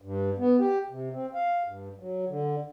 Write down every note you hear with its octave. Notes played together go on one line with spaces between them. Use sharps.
G2
B3
G4
C3
C4
F5
G2
F#3
D3